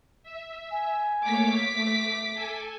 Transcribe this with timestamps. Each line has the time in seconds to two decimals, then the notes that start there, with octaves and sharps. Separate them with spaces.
0.23 E5
0.71 G#5
1.25 A3 A#3 C#5 D6 B6
1.75 A3 E5
2.34 A4 G#5